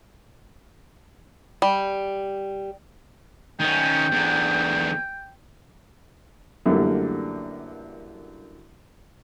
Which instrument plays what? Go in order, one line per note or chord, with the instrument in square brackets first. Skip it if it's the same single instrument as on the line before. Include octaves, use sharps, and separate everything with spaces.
[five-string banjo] G3
[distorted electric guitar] D#3 C#4 [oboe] G5
[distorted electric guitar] E2 D3
[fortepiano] F#2 D3 E3 G3 A3 A#3